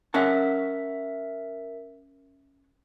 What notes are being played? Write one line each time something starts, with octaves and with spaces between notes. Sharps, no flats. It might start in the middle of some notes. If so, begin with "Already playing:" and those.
C#4 A#4 E5 F#5 A5